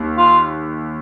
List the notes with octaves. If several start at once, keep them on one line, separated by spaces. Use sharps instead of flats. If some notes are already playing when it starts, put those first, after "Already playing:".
Already playing: D#2
F4